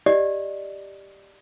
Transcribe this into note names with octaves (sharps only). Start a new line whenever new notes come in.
G4 D5 D#5